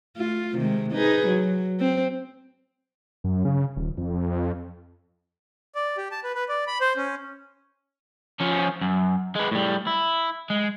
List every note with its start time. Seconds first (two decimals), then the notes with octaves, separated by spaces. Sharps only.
0.17 A3 F4
0.57 C3 D#3 G#3
0.92 D#4 G#4 B4
1.28 F#3
1.80 C4
3.24 F#2
3.45 C#3
3.77 D#1
3.98 F2
5.75 D5
5.97 G4
6.11 A5
6.24 B4
6.35 B4
6.49 D5
6.67 B5
6.81 C5
6.97 C#4
8.40 F3 C#4
8.82 F#2
9.36 G#3 B4
9.51 A2 G3
9.87 E4
10.50 G#3